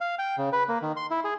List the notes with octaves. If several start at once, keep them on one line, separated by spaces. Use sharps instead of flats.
F5
G5
C#3
B4
A#3
D#3
C6
E4
G#4